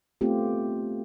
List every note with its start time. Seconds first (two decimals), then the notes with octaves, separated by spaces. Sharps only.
0.21 A3 B3 C4 F4 G4